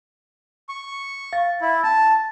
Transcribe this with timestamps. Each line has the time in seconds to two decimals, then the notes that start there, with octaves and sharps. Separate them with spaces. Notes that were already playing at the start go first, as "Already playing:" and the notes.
0.69 C#6
1.33 F5 A6
1.61 E4
1.84 A5 A6